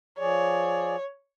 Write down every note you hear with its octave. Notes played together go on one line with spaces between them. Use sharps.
F3 G#4 C#5 D5